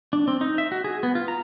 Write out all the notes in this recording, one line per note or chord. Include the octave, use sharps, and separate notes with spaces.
D4
C4
D#4
E5
F#4
G#4
B3
F4
A#5